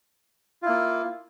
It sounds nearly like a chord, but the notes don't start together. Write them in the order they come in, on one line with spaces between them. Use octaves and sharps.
F4 E4 A#3